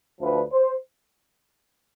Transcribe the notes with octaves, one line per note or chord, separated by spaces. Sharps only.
D2 D3 F3 A3 B4
C5